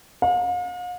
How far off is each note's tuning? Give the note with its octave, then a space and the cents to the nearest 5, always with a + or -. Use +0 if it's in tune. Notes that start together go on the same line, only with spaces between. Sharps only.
F5 +45